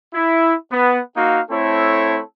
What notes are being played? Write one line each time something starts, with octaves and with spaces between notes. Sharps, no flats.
E4
B3
A#3 D#4 F#4 F5
A3 C4 E4 A4 C#5